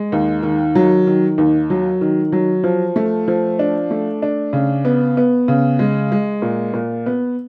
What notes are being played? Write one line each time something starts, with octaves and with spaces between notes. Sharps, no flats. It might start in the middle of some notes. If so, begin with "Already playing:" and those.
Already playing: G#3
D#2
D#3
F#3
D#3
D#2
F#3
D#3
F#3
F3
A3
F3
D4
A3
D4
C#3
B3
B3
C#3
G#3
G#3
A#2
A#2
B3